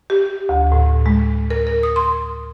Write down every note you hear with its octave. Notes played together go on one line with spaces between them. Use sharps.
G4
D2
A2
G#3
A#4
A#4
D#6
C6